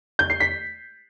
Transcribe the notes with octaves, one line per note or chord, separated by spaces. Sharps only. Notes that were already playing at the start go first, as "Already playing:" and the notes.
G6
C7
B6